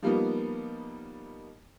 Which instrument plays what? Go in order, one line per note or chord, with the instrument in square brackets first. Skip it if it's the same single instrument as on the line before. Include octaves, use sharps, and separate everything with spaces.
[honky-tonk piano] F3 G3 A#3 B3 D#4